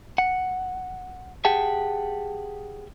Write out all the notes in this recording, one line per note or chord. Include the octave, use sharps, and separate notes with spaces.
F#5
G4 G#4 F#5 G5 A5